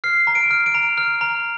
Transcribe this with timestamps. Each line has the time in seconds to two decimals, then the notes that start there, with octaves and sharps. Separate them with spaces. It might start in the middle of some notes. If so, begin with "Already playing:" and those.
0.04 F6 C7
0.27 A#5
0.35 D7
0.51 F6
0.66 D7
0.75 A#5
0.98 F6
1.21 A#5